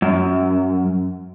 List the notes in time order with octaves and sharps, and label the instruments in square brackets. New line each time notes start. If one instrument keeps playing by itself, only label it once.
[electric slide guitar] F#2